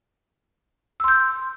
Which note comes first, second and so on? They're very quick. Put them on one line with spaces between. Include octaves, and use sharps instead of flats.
E6 C6 G6